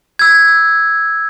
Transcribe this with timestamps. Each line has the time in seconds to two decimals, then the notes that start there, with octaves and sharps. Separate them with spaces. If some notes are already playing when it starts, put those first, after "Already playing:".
0.19 E6 G#6